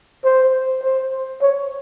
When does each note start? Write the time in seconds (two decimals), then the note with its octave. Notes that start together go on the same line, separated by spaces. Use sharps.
0.25 C5
0.83 C5
1.42 C#5